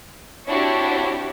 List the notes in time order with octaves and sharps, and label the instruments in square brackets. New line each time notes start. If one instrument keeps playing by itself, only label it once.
[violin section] C4 D4 E4 F#4 G4 C#5